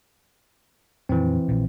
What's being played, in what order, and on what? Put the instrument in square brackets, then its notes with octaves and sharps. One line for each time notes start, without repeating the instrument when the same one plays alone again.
[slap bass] F2 A#2 D#3 [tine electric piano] E3 C4
[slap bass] A#1 A#2